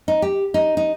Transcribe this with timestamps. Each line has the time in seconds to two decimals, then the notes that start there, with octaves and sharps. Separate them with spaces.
0.08 D#4
0.22 G4
0.54 D#4
0.77 D#4